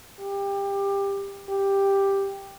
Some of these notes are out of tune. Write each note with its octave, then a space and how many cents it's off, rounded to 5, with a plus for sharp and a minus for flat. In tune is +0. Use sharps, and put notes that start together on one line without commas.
G4 +20
G4 +5